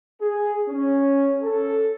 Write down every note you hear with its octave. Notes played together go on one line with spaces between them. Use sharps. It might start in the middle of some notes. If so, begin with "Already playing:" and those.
G#4
C#4
A4